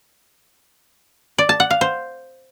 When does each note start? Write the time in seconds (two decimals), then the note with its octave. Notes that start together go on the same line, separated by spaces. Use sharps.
1.38 D5
1.49 A5
1.60 F#5
1.70 F5
1.81 C5